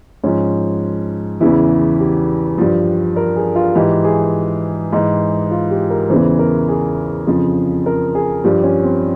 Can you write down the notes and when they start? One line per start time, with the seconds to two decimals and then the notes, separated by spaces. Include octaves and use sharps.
0.24 G#2 F3 C#4
1.40 E2 C#3 E3 E4
1.99 G4
2.58 G2 F3
3.16 A#4
3.36 G#4
3.55 F4
3.75 G#2 E3 G4
4.04 G#4
4.92 G#2 E3
5.51 F4
5.70 G4
5.90 A#4
6.10 E2 C#3 E3 C5
6.39 A#4
6.69 G#4
7.27 F2 C#3 F3
7.86 A#4
8.15 G#4
8.44 G2 F3 G4
8.63 C#4
8.84 C4